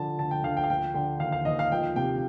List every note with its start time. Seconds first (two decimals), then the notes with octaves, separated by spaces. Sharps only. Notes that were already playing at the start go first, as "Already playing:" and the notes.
Already playing: D3 F3 A5
0.19 D2 A5
0.31 G5
0.44 D2 F5
0.57 G5
0.64 F5
0.70 F3 G5
0.94 D3 G5
1.20 D#2 F5
1.32 F5
1.45 D#2 D#5
1.59 F5
1.72 F3 G5
1.96 C3 G5